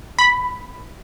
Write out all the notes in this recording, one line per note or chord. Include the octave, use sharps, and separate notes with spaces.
B5